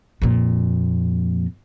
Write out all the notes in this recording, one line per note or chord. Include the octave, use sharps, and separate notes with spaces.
F2 A#2